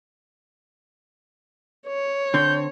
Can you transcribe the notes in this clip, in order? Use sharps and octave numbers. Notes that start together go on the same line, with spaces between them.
C#5
D3 C4 G6